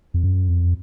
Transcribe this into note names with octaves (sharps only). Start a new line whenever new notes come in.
F2
F#2
F2